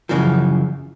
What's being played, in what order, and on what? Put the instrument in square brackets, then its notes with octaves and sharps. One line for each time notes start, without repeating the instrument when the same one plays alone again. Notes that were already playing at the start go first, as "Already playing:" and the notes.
[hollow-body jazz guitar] F#2 A2 C#3 E3 F3